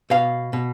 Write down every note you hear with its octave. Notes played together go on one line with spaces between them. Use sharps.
B2 F5
B2